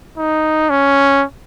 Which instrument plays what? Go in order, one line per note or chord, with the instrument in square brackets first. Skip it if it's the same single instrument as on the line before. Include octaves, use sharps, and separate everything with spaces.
[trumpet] D#4
C#4